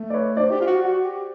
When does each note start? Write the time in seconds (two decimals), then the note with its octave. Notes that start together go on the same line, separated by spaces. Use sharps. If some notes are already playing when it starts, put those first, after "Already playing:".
Already playing: A3
0.10 D5
0.14 B4 C#5
0.37 D4 C5 D5
0.51 G4
0.61 F4
0.67 F#4
0.82 F#4
1.05 G4